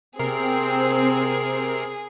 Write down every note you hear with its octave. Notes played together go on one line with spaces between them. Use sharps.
C3 C4 G#4 A#4 C7